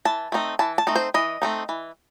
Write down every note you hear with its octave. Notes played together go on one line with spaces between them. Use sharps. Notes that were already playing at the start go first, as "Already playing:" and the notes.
E3 A5
A3 C4 D#4
E3 A5
A5
A3 C4 D#4
C5
E3 D#5
A3 C4 D#4
E3